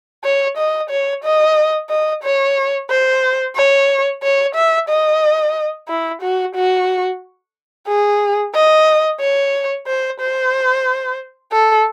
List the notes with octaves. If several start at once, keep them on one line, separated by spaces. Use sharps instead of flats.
C#5
D#5
C#5
D#5
D#5
C#5
C5
C#5
C#5
E5
D#5
E4
F#4
F#4
G#4
D#5
C#5
C5
C5
A4